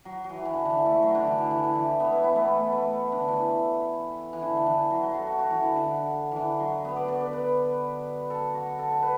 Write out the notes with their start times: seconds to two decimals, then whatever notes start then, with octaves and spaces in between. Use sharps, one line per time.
0.05 F#3
0.24 F#3
0.30 E3
0.45 E3
0.54 D3
0.65 D3
0.70 E3
0.86 A3
1.02 F#3
1.15 D3
1.27 E3
1.38 D3
1.51 E3
1.64 D3
1.75 E3
2.00 B3
2.12 E4
2.24 B3
2.36 A3
2.48 A3
2.72 A3
3.12 D3
3.28 E3
4.33 E3
4.42 D3
4.57 D3
4.66 E3
4.90 F#3
5.03 F#3
5.14 A4
5.27 F#4
5.39 F#4
5.50 E3
5.63 D3
5.76 D3
6.31 D3 E3
6.60 F#3
6.85 B3
6.96 D5
7.08 D5
7.21 B4
7.33 B4
8.30 A4
8.54 F#4
8.79 A4
8.92 A4
9.02 B4